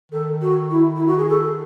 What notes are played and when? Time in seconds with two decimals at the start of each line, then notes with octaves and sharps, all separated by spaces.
0.12 D#3 A4
0.41 F#4
0.70 E4
0.96 E4
1.07 F#4
1.18 G#4
1.29 A4